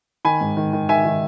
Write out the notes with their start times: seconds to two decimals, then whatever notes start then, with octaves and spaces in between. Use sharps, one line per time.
0.25 D#3 G#5 B5
0.41 G#2
0.57 D#3
0.73 D#3
0.89 D#3 E5 G#5
1.05 D#3